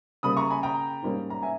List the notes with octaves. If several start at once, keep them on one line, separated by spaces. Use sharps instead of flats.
C#3 G3 A#3 B5 D#6
A#5 C#6
G#5 B5
G5 A#5
G#2 G3 A#3 C#4
A#5
E5 G#5